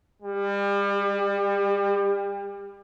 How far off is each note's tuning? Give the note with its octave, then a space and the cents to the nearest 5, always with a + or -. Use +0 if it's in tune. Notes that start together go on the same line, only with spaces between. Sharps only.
G3 +35